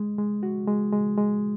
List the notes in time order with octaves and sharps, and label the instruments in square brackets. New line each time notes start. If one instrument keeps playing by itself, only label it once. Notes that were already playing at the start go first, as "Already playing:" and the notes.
Already playing: [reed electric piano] G#3
G#3
F#4
G#3
G#3
G#3